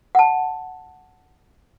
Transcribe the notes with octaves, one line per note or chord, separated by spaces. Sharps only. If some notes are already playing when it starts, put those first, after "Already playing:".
F#5 A5